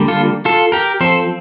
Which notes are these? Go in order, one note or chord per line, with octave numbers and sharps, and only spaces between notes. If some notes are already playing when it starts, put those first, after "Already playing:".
Already playing: D3 G3 A#3
F4 A4
F4 A4
G4 A#4
F3 C4 A4 C5